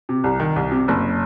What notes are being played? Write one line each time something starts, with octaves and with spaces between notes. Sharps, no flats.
C3
C2
D#3
C2
C3
F#1